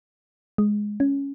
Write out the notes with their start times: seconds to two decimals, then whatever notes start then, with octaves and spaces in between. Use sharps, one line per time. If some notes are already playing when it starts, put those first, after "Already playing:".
0.58 G#3
1.00 C#4